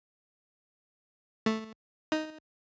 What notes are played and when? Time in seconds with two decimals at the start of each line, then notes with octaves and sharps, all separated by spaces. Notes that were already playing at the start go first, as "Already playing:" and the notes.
1.46 A3
2.12 D#4